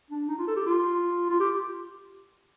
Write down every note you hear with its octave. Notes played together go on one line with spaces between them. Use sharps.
D4
D#4
F4
A4
G4
F4
F4
G4